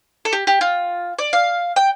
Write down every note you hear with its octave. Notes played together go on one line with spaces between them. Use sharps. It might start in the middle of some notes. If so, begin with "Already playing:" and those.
A4
G4
G4
F4
D5
F5
G5